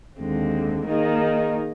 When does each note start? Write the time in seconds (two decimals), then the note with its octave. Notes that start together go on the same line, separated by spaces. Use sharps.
0.17 D#2 D3 G#3 C4
0.86 D#3 A#3 D#4 G#4